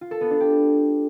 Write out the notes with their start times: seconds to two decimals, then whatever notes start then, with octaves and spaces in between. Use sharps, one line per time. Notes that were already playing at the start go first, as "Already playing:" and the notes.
0.01 F4
0.11 A4
0.21 B3
0.31 D4
0.40 G4